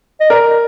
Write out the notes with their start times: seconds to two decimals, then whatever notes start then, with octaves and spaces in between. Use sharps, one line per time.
0.20 D#5
0.30 A#4 D5